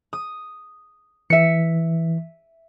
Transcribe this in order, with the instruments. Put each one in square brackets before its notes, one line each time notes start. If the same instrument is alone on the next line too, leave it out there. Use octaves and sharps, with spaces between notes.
[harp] D#6
[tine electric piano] E3 [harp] E5 C#7